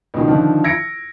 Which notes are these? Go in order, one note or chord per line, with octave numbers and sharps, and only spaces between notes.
C#2 B2 D#3
D3 D#3 F3
E6 G#6 A#6 C#7 D7